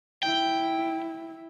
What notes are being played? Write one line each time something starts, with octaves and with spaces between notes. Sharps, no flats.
E4 G5